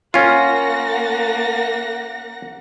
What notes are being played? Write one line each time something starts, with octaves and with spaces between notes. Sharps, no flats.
A#3 C#4 F4 F#5 A#6